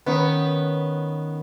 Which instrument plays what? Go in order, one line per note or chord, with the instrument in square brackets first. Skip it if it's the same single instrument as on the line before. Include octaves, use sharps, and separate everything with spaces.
[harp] D#3 C#4 D#4 [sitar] B3